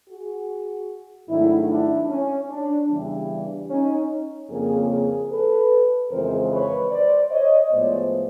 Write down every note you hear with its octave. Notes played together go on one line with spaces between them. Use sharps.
F#4 G#4
G#2 D#3 F#3 A3 D4 E4
D4 E4
C#4
D4
E2 C#3 E3 G3
D4
C#4 D#4
F2 C#3 F3 A#3 C#4 G#4 A#4
G#4 A#4
A4 B4
F2 C#3 E3 G#3 A#4 C5
B4 C#5
C5 D5
C#5 D#5
A2 F3 G#3 B3 C5 D5